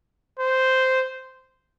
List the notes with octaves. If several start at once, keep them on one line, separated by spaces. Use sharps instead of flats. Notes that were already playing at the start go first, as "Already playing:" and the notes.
C5